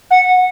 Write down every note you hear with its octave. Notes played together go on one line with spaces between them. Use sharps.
F#5